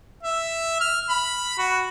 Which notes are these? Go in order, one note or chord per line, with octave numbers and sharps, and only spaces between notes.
E5
F6
B5
F#4